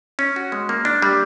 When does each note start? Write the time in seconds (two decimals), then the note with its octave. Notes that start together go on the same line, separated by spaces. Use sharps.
0.19 C#4
0.36 F#4
0.52 G#3
0.69 A#3
0.85 D4
1.02 G3